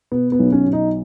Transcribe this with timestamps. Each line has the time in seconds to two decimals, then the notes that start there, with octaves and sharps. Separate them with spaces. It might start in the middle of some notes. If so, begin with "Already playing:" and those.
0.12 B2 B3
0.32 B3
0.40 B1
0.52 C#4
0.66 B2
0.73 D#4